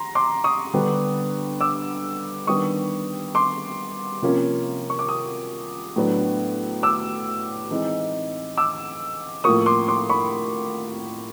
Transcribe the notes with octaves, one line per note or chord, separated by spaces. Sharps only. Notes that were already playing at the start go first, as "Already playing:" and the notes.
Already playing: A#5 C6
C6 D6
C#6 D#6
D3 G3 B3 D4
D6 E6
D#3 G3 B3 D4 C#6 D#6
C6 D6
C3 F3 A#3 C#4
C#6
D6
C#6 D#6
A2 F#3 B3 D4
D6 E6
E3 G#3 C4 D#4
D6 E6
A2 F3 A#3 C#6 D#6
C6 D6
C6 D6
B5 C#6